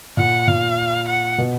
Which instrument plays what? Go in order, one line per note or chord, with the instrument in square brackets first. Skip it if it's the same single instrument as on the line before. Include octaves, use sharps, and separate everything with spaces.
[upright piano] A#2 [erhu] F#5
[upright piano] A#2 [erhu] F5
[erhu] F#5
[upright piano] B2